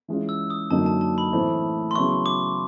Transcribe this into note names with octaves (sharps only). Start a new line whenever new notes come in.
E3 G#3 C#4 F4
E6
D#6
F#2 D3 F#3 A#3 D#4 A5
A5
A5
B5
A2 E3 A3 C4
C6
C#3 F#3 B3 E4 C#6
D6